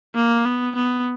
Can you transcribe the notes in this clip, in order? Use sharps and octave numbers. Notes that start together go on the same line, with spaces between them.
A#3
B3
B3